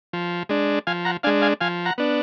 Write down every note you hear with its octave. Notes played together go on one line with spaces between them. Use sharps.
F3
G#3 D4
F3 F5 G#5
F#5 A#5
G#3 D4 F5 G#5
F5 G#5
F3 F5 G#5
F#5 A#5
B3 D4